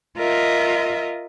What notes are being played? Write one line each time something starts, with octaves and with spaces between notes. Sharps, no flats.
F4 A#4 D#5 E5